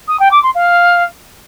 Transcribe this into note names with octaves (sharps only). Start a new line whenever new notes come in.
D#6
G5
D6
C6
F5